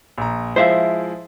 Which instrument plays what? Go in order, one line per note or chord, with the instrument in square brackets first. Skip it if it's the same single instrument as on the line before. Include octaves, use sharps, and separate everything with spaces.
[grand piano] A#1 A#5
[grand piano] F3 G#3 E4 [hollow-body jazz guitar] C5 E5 F5